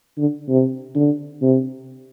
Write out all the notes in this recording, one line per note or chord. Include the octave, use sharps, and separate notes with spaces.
D3
C3
D3
C3